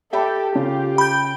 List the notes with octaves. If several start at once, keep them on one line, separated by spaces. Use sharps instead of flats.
G4 A4 E5 G5 B5
C#3 F4
G5 B5 G6